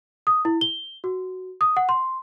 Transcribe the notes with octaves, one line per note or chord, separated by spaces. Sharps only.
D#6
E4
G7
F#4
D#6
F#5
C6